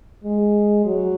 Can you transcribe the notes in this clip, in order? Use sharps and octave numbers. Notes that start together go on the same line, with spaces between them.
G#3
F#3